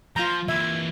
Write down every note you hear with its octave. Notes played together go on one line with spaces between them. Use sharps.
F3 F4 A#5 G6
E3 A#3 E5 G#6